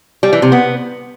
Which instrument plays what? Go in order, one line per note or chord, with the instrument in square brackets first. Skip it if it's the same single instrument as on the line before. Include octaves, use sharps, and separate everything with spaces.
[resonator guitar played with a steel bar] G3
E3
C3
B3